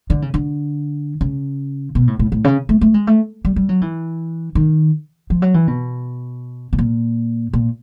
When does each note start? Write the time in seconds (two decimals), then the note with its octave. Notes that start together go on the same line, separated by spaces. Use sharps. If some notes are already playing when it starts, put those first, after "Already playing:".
0.10 D3
0.22 C#3
0.34 D3
1.21 C#3
1.95 B2
2.08 A2
2.19 A2
2.32 A2
2.44 C#3
2.69 A3
2.81 A3
2.94 G#3
3.07 A3
3.45 G3
3.56 G3
3.69 F#3
3.81 E3
4.55 D#3
5.30 F3
5.42 F#3
5.54 E3
5.68 B2
6.73 B2
6.79 A#2
7.53 A#2